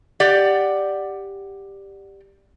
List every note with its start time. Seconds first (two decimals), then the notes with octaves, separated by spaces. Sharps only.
0.20 G4 D5 F#5